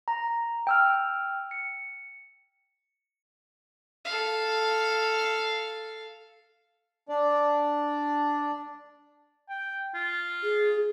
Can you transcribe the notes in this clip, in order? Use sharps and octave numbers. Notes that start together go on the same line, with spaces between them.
A#5
G5 E6 F6
C#7
A4 F5
D4 D5
G5
F4
G#4